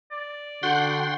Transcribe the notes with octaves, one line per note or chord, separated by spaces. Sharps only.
D5
D3 F#4 F#5 G5 C6